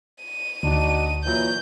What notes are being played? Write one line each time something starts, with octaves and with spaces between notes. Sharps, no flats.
D#7
D2 D4 D#4 F#4
A#2 E3 F#3 G6